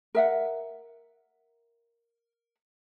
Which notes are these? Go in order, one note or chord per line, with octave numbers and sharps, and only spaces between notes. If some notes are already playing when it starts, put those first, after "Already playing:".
A#4 E5 F#5